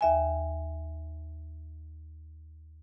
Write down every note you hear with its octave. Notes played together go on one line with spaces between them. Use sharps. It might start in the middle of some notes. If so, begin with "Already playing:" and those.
D#2 E5 G#5